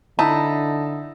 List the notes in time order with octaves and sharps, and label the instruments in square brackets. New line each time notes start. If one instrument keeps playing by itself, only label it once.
[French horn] D3 [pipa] D#4 [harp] E4 [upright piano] A5